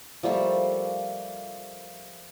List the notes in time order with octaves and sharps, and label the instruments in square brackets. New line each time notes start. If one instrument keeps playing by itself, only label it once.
[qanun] F3 G3 A3 A#3